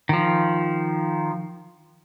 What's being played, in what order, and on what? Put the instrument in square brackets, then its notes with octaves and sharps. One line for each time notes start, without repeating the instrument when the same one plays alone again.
[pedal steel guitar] D#3 F3